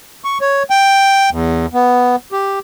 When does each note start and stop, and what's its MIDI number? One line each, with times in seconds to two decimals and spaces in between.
0.24 0.38 85
0.41 0.63 73
0.70 1.30 79
1.31 1.66 40
1.74 2.16 59
2.32 2.59 67